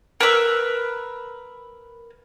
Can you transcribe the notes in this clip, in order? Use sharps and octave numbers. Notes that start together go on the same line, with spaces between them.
A#4 B4 E6